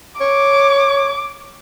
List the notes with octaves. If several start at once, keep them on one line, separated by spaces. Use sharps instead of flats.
C#5 D6